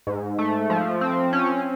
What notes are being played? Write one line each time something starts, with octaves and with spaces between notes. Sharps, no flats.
G#2
A3
F3
C4
C#4